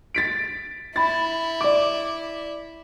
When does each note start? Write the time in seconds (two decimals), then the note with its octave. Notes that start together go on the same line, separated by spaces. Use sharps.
0.15 A6 B6 D7
0.96 E4 B5 A6
1.61 D5 D6